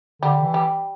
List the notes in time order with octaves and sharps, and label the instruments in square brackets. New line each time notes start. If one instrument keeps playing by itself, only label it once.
[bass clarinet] D3 [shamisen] G3
[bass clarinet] D3
E3
[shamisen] G3